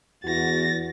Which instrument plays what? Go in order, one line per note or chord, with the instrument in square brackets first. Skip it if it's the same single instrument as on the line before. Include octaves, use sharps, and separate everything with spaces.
[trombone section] E2 [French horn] F#4 [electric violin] A6 A#6